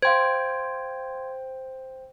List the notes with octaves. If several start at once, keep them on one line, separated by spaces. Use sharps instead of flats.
C5 F5 G5 C6 G#6